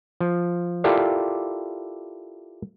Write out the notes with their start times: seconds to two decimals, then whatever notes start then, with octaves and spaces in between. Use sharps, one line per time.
0.20 F3
0.84 E4 F4 G4 A4 A#4 D5